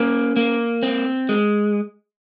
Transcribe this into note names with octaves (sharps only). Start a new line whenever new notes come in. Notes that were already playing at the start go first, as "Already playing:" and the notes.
Already playing: A#3 C#4
A#3
C4
G#3